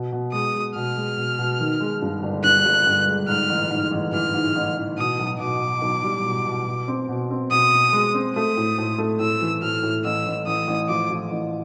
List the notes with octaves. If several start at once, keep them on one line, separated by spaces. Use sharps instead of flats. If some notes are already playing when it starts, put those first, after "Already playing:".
Already playing: B2
B2
G#3 D#6
G#3
B2 F6
G#3
B2
B2
D#3
G#3
G2
G1
G2 F#6
G1
G1
G#3
G#2 F6
A1
G#2
A1
E3 F6
G#2
A1
A1
B2 D#6
B1
B2 D6
B2
B1
G3
B2
B2
B2
C4
B2
C4
B2 D#6
B2
G#3
C4
A3 D#6
A2
A2
A3
A2 E6
E3
A2 F6
A2
A1 E6
A1
A1 D#6
A1
F3 D6
F3
A1